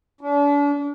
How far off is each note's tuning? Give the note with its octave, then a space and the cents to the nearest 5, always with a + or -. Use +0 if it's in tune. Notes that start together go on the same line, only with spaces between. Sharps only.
D4 -40